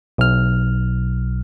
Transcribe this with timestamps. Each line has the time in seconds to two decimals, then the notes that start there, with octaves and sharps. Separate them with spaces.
0.18 B1 F6